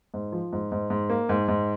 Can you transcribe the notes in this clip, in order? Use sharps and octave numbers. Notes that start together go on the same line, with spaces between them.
G#2
F3
G#2
G#2
G#2
A#3
G#2
G#2